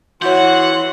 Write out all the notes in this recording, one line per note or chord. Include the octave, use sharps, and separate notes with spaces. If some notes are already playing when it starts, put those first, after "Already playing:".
E3 F#4 C#5 F#5 C6 G6